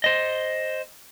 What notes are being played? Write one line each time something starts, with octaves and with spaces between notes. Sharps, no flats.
C5 D#5